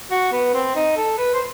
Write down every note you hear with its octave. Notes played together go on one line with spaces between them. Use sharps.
F#4
B3
C4
D#4
A4
B4
C5